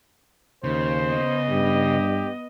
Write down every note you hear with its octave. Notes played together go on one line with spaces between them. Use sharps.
D#2 C#3 C5
B3 D#5
G2 G4